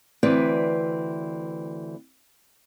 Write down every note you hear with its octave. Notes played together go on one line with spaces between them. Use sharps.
D2 E3 C4 B4 D5